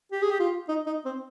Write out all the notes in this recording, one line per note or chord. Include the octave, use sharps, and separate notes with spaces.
G4
G#4
G4
F4
D#4
D#4
C4